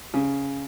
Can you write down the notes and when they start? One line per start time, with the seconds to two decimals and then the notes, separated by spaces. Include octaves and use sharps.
0.14 C#3